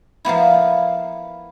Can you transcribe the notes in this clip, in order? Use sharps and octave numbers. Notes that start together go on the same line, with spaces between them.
F3 A#3 B3 E4